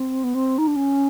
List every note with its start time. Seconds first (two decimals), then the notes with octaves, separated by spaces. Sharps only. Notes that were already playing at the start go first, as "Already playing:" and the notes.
Already playing: C4
0.24 B3
0.35 C4
0.58 D#4
0.67 D4
0.76 C#4